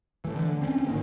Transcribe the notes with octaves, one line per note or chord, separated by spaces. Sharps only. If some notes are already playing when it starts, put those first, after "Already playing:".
E3 A3
D3
C4 C#4
G#2 D#3 A#3